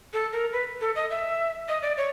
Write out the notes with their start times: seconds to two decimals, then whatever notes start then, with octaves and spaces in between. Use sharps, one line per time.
0.13 A4
0.33 A#4
0.52 B4
0.81 A4
0.95 D#5
1.10 E5
1.69 D#5
1.82 D5
1.97 C#5